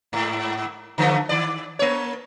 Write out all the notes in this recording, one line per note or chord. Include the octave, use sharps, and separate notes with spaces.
G#2
D3 F3 A3
D#3 D5
A#3 C#5